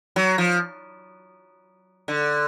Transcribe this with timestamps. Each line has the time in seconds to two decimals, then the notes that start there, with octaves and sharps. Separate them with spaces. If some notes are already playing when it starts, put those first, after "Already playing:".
0.16 F#3
0.38 F3
2.08 D3